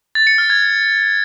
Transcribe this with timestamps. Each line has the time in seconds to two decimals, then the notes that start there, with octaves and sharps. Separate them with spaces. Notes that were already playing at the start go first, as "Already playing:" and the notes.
0.15 A6
0.27 C#7
0.38 F6
0.50 G#6